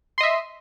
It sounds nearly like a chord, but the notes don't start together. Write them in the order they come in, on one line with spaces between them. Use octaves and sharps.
C6 D#5 E5